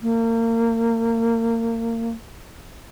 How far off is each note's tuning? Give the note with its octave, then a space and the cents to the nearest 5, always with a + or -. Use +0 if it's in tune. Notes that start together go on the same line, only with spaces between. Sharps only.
A#3 -30